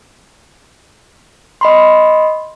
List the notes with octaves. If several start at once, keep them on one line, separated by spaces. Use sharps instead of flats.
D#5 B5 C6